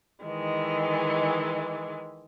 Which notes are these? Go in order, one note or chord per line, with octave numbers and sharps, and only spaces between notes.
D#3 E3 G#3